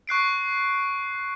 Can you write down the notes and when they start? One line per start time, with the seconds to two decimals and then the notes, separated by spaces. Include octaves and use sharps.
0.07 C#6 F#6 C7 D7